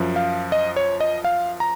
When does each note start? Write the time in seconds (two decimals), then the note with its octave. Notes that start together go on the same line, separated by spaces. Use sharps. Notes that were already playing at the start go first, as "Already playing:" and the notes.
Already playing: F#2 F3
0.16 F5
0.52 D#5
0.76 C#5
1.00 D#5
1.24 F5
1.60 A#5